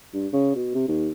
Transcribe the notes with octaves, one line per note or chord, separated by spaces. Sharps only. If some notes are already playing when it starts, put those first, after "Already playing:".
G2
C#3
B2
C3
D#2